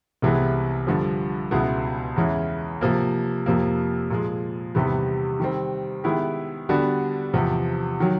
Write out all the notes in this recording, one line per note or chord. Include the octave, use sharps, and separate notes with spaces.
C2 C3 E3 G#3 B3
G2 D3 F3
C#2 B2 G#3 B3 E4
E2 C#3 E3 G#3
C3 F3 A#3
F2 C3 F3 A#3
A#2 F3 G#3
E2 C3 D#3 G3 B3
D#3 G3 C4
D#3 G#3 B3 E4 G4
D3 G3 B3 D4 F#4
E2 C3 F3
D#3 F#3